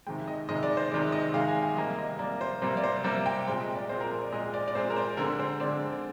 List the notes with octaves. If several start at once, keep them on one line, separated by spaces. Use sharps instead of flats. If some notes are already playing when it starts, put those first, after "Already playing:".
C3 D#3 G#3 G5
D#5
C3 D#3 G#3 D#5
D5
C5
C3 D#3 G#3 D5
D#5
C3 D#3 G#3 F5
G#5
G5
C3 G3 A#3 D#5
D#5
C3 G3 A#3 D5
C5
C3 G3 A#3 C5
D5
C5
C3 G3 A#3 C5
G5
A#2 G#3 C4 G5
D#5
D5
A#2 G#3 C4 C5
A#4
A#4
D5
A#2 G#3 C4 D#5
D5
D5
A#2 G#3 C4 C5
A#4
C5
D3 G#3 C4 A#4
C5
D3 G#3 C4 D5